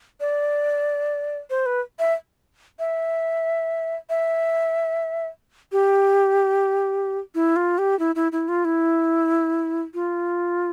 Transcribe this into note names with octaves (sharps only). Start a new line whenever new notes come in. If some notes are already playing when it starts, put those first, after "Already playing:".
D5
C5
B4
E5
E5
E5
G4
E4
F4
G4
E4
E4
E4
F4
E4
F4